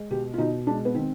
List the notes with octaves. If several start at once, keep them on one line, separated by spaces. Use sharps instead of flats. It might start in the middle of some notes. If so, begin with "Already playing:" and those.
Already playing: G#3
B2 G4
F4
B2 D#4
G#3 D4
B3
D#3 C4